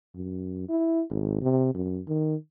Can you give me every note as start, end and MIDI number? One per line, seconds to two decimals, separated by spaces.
0.15 0.68 42
0.69 1.02 64
1.10 1.38 32
1.42 1.73 48
1.75 2.01 42
2.08 2.35 51